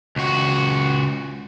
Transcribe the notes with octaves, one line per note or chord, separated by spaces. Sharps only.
C#2 F#4